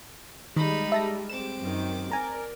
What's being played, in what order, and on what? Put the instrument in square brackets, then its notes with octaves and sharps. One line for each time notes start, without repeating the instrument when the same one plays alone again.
[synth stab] D#3 [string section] G3 G#3 [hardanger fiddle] D#4 B5
[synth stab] E5 A5 A#6
[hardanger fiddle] C4 D6 [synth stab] E7
[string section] F#2 D#3
[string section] A#4 D5 [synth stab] G#5 A#5